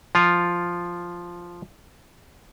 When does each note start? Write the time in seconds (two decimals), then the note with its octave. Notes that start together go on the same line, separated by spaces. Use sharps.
0.15 F3 F4